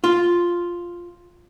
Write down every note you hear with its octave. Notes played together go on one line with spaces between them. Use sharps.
F4